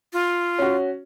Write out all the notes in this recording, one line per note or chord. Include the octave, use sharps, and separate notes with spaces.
F4
C#4 F#4